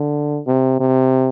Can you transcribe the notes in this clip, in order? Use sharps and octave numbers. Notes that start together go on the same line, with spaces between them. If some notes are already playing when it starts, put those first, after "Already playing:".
Already playing: D3
C3
C3